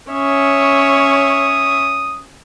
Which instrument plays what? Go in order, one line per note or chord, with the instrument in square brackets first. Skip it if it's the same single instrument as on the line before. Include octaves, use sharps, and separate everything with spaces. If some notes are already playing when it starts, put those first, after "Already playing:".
[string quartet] C#4 C#5 E5 [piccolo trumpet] D#6